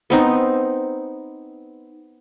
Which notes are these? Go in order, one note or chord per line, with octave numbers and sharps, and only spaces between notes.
B3 C4 D#4